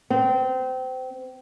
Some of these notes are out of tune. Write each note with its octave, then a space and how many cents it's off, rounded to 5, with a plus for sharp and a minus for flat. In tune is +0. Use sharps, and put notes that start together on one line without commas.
C4 -25